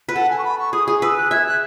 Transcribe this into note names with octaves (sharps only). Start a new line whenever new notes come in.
B4
A4 F#5
G#5
C#6
B5
C#6
G#4 D#6
G#4 D#6
B4 E6
F#6
E5 G#6
F#6